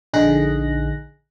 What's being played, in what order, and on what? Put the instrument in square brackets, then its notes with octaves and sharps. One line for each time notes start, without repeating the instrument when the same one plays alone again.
[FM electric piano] A#1 D3 D#4 G#4 F#6 A#6